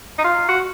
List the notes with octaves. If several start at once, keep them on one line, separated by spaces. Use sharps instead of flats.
D#4
F4
F#4